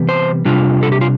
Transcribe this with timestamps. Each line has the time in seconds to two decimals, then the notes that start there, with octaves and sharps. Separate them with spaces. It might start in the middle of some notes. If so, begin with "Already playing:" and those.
Already playing: C3 E3 G3 B3
0.09 C5
0.45 C3 G3 D4 F4
0.83 A4
0.92 G4
1.01 F4